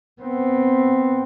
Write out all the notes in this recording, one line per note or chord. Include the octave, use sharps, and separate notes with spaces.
B3 C4